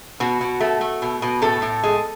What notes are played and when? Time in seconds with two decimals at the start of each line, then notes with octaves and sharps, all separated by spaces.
0.20 B2 F#4
0.41 B2
0.61 A3
0.81 A3
1.02 B2
1.22 B2
1.42 A2 A4
1.62 A2
1.83 G#3